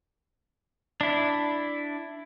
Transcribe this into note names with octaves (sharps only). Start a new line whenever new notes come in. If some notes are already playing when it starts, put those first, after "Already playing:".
D4 E4